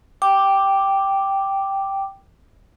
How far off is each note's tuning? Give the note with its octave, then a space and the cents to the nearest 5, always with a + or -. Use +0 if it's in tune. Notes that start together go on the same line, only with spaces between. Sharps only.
G5 -5 D6 +0